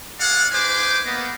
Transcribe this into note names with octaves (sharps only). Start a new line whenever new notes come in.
G#4 D5 F5 F#5
D#4 G#4 B4 C5 G#5 D6
A#3 B3 D#5